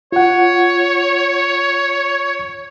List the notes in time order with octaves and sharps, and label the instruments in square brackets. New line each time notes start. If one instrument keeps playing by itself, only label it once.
[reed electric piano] F4 F#5 [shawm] C#5